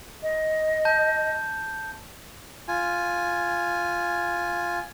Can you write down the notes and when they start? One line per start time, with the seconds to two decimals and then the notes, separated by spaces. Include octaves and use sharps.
0.23 D#5
0.85 A5 G6
2.68 F4 G#5